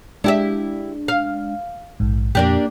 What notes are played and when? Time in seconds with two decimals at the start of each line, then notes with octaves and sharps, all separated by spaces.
0.24 G#3 D4 E4 G4 E5
1.08 F5
2.00 A#1 G#2
2.35 F2 A#2 A#3 D4 G4